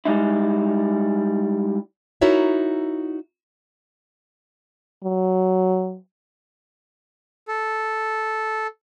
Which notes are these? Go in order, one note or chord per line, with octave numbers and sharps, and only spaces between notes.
G3 G#3 D#4 E4
D#4 E4 F#4 A#4 C#5 E5
F#3
A4